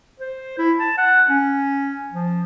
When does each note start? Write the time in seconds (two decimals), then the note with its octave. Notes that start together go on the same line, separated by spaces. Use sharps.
0.20 C5
0.58 E4
0.79 A5
0.98 F#5
1.29 C#4
2.12 F3